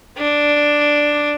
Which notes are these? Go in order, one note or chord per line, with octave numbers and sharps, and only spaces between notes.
D4